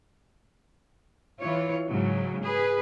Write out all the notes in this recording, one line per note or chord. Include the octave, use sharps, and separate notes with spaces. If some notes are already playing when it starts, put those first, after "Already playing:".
E3 F4 C#5
G#2 C#3 F#3
G#4 B4